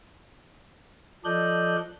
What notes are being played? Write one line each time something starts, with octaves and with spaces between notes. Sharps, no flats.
F3 A4 D5 D#5 F#6 G6